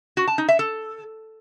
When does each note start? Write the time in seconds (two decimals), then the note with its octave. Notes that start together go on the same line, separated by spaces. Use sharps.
0.17 F#4
0.27 A5
0.38 D#4
0.49 E5
0.59 A4